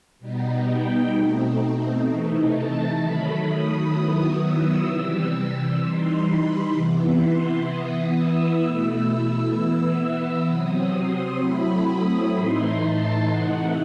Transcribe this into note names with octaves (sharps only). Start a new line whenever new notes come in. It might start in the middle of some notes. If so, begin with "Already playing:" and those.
B2 G3 B3 D#4
G5
B2 A3 C4 D#4
C3 E3 A3 D#4
A5
D#3 F#3 A3 B5
D#6
D#3 F#3 B3 E4 D#6
E6
C3 E3 G3
E3 G3 D#4 C6
B5
C3 E3 B3 E4
C6
E3 B3 E4 D#6
E6
B2 A3 E4
E3 B3 E4 E6
C3 F#3 C4 D#6
C6
F#3 A3 C4 E4 B5
D#6
A2 E3 A3 D#4 C6
A5
C3 E3 A3 D#4 F#5